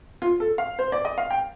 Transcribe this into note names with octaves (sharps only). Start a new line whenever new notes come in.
F4
A4
F5
C5
D5
D#5
F5
G5